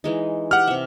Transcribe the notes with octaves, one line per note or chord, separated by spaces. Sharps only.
E3 G#3 D#4
G4 F#5 F6
C3 E5